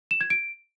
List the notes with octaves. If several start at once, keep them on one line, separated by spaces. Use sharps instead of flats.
E7
G#6
D7